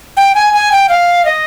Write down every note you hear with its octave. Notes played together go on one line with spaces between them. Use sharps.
G5
G#5
G#5
G5
F5
D#5